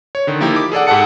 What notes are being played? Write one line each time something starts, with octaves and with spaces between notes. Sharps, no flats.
C#5
D3 D#3
F3 A#3 D#4 E4 G4
D6
G#4 A4 D5 F#5
G#2 G4 A4 F#5 A5 C#7